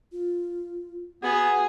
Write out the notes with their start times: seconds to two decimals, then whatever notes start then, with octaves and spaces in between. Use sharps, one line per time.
0.12 F4
1.24 B3 F#4 G#4